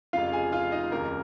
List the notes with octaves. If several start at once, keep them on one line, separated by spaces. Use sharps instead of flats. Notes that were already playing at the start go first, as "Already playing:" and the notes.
F1 F2 C#3 F4 F5
G#4 G#5
F4 F5
D#4 D#5
F1 D#2 C#3 A#4